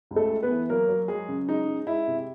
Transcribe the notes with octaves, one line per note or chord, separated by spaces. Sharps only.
C#2
A3 A4
G#3
B3 B4
E3
F#3 A#3 A#4
F#3
F#3 G#3 G#4
C#3
G#3 D#4
G#3
G#3 E4
C3